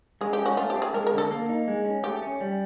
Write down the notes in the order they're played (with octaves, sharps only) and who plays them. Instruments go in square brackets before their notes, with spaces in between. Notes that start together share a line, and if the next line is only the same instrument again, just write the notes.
[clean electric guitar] G#3 [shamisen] G#4
[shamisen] G4
[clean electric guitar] C#4
[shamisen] F#4
[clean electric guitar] A3 [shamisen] F4
[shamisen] G4
[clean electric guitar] C4
[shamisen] G#4
[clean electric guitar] G#3 [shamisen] A#4
[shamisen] A#4
[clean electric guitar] D3
[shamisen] A4
[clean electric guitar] A#3
D#4
G#3
C#4
[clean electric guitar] A3 [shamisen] G4
[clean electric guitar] C#4
G3